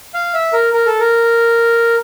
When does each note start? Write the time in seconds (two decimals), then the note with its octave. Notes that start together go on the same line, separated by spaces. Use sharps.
0.14 F5
0.34 E5
0.53 A#4
0.73 A#4
0.86 A4
1.00 A#4